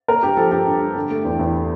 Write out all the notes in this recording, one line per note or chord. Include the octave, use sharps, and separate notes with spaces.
A#3 A#4
G2 G4
F3 A4
G2 G4
G2
G2
D3
A3
E2
E2